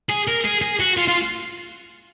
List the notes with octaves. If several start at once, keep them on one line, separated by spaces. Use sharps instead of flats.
G#4
A#4
G#4
G#4
F#4
F4
F4